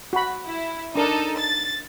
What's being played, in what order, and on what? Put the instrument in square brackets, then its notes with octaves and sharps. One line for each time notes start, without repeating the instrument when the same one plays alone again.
[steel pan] F#4 B5
[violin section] E4
[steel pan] D4 A#4 [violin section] D#4 A4
[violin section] A6